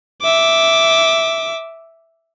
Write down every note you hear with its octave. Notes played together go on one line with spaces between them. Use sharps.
E5 D6